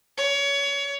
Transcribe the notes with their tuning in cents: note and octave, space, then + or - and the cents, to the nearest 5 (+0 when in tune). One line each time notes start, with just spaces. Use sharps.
C#5 +25